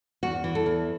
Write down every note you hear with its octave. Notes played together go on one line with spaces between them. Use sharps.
E2 F#4
E3
A4
E2